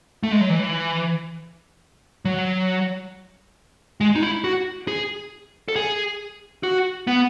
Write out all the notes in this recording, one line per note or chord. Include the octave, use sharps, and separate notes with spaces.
A3
G#3
F#3
E3
F#3
G#3
D#4
E4
F#4
G#4
A4
G#4
F#4
B3